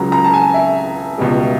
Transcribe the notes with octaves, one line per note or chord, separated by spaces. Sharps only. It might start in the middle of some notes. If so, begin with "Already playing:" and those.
Already playing: C#2 C#3 F#3 A#5
A#5
A5
G#5
E5
C#2 B2 G3